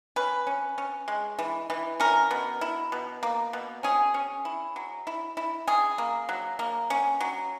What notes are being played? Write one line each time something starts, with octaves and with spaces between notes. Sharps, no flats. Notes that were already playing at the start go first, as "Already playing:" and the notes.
C#4 B4
C#4
C#4
G#3
E3
E3
C#4 A#4
B2
E4
B2
A#3
B2
C#4 G#4
C#4
E4
F#3
E4
E4
C#4 G#4
A#3
F#3
A#3
C#4
F#3